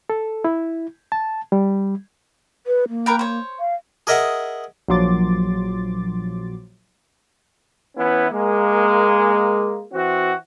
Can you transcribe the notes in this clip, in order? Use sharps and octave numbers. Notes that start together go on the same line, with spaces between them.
A4
E4
A5
G3
B4
A#3
A#4 B4 G5
C5 C#5
F5
G#4 A#4 D#5 E5 F#5
A#1 F3 F#3 C6 D6 A6
E3 B3 C#4 E4
G#3 A#3
E3 C4 F#4